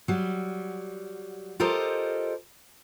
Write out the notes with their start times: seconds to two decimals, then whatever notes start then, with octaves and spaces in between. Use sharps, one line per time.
0.08 F#3 G3
1.60 F4 G4 A4 A#4 C5 D#5